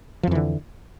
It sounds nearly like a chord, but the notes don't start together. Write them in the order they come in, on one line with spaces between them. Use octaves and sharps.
F3 F2 E3 D3